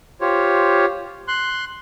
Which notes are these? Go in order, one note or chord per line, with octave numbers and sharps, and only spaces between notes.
F4 G4 C5 C#5
C6 F#6